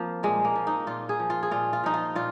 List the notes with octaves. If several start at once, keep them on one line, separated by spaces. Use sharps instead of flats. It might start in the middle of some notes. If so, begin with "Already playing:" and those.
Already playing: F3 A#3 C4
A#2 G#3
A#3
F3
D#4
A#2 F4
G#4
F3
F4
G#4
A#2 F4
F4
F3 D#4
F4
A#2 F4